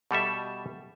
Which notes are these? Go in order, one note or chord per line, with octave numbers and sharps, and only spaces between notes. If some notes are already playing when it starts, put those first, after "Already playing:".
B2 G3 A4 E5